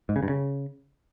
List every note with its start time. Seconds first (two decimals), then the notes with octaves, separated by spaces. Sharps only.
0.09 G#2
0.16 C#3
0.23 G2
0.29 C#3